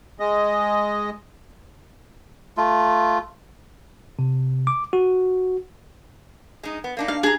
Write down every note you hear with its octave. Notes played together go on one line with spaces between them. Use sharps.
G#3 D#5
A3 F4
C3
D6
F#4
G#3 D#4
B3
A#3 D4 D#4
F5
D4 G#4 A#5